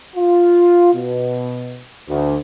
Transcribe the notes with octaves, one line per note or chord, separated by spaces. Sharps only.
F4
B2
D2